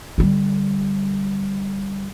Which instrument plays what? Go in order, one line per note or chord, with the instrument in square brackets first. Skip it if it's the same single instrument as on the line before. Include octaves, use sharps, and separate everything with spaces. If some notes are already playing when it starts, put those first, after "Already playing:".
[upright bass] D3 G3